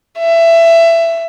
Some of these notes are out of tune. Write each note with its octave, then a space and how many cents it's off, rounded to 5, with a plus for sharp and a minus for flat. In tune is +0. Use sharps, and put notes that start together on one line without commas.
E5 +20